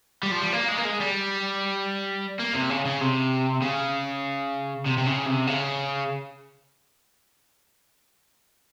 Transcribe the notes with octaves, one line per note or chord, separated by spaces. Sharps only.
G3
F3
G3
A#3
G#3
A#3
G#3
G3
A#3
C3
C#3
C#3
C3
C#3
C3
C3
C#3
C3
C#3